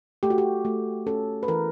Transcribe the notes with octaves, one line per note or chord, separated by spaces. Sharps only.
A3 G4
F#4
G4
A3
C#4 A4
B4
E3 A#4